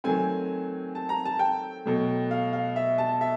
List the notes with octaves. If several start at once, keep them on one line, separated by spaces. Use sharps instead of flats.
D#3 F#3 A3 C4 G#5
A5
A#5
A5
G5
B2 F#3 A3
F5
F5
E5
A5
E5